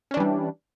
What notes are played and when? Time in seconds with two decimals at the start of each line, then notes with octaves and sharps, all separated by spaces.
0.11 C#4
0.14 D4
0.17 E3
0.20 G3